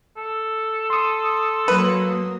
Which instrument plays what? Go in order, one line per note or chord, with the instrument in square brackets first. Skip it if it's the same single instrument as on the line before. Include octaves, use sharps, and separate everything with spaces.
[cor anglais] A4
[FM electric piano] C6 D#6
[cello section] F#3 A#3 [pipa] B4